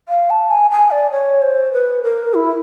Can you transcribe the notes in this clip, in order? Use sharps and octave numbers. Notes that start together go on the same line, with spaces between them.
F5
A5
G#5
G#5
D5
C#5
C5
B4
A#4
E4